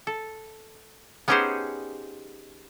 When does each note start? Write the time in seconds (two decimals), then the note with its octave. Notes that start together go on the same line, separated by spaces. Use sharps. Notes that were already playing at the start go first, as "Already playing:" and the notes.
0.07 A4
1.28 B3 C#4 D#4 G4 G#4 C5